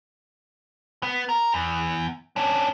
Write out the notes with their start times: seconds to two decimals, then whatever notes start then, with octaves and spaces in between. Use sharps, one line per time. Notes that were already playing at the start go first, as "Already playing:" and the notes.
1.03 B3
1.29 A#4
1.54 E2
2.36 C#4 D4